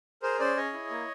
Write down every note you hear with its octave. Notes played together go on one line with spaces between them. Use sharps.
G#4 A#4 C5
C#4 C5 D5
G#4 C#5 D#5
E4
A#3